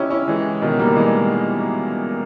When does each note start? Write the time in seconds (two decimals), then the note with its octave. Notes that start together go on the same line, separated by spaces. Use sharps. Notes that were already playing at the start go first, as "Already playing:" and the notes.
Already playing: C#4 D#4 E4 G4
0.10 C#4 E4
0.27 E3 G#3
0.61 B2 D#3
0.79 G3 A#3
0.96 E3 G#3